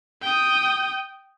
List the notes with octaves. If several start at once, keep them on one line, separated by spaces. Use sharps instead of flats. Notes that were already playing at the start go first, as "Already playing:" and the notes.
G5 D#6